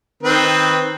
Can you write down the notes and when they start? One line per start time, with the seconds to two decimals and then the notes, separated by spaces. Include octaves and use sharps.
0.23 D#3 C4 B4